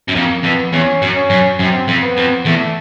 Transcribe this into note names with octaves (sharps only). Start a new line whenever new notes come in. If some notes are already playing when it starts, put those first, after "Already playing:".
F#2
F2 A#3
F2 B3
E2 C#4
F#2
C#4
F#2
F#2 C4
F2
B3
F2
E2 A3